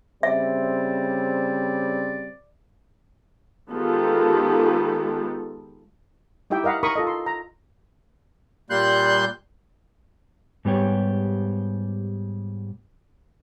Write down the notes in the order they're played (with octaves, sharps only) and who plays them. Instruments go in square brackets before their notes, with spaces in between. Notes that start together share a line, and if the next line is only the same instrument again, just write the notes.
[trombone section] C#3 G3 C4 [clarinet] D5 [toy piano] E5
[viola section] D#3 G#3 B3 F4 G4 A4
[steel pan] D#4 E4 G4 E5 G5
A#4 D#5 F5 F#5 B5
D#4 A#4 B5 C#6 D#6
F4 A4 D#5
C6
A#5
[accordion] A#2 G3 A#3 C6 F#6 G6
[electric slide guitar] G#2 G3 B3 G4 C#5